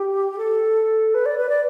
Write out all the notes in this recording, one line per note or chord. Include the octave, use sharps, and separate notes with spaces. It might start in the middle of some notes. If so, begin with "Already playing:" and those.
Already playing: G4
A4
B4
D5
B4
D5